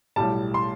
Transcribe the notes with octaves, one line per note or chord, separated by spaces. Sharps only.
B1 A2 G3 A5
C6